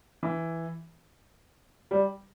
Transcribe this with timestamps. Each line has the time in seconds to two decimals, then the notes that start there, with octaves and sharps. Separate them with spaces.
0.23 E3
1.91 G3